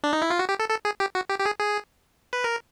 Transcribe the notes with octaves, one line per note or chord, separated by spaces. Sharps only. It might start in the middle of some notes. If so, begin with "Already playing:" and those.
D4
D#4
E4
F4
F#4
G4
A4
A4
G#4
G4
F#4
G4
G4
G#4
G#4
B4
A#4